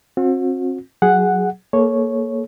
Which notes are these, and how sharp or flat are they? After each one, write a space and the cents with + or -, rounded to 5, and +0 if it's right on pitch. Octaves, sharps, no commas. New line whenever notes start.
C4 +30 F#4 -40
F#3 +0 G#4 +0 F#5 +0
A#3 +0 A4 -40 C#5 -5